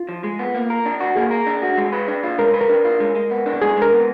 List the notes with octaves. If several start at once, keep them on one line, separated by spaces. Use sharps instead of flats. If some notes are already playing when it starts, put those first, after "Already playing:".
Already playing: F4
F3
G#3
B3
A#3
A#4
D4
F#4
A#3 G#4
A#4
D4
F#4
G#3
B4
D4
F4
G#3 A#4
B4
A#4
D4
F4
G#3
G#3
B3
D4
G#3 G#4
G#3 A#4
B3